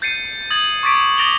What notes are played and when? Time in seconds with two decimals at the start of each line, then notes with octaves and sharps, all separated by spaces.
0.02 G6 A6 C7 C#7 D#7
0.50 D#6 G#6 A6 F#7
0.83 C#6 D6 A6 B6 D7
1.18 D#6 A6 A#6 D7 F7 G7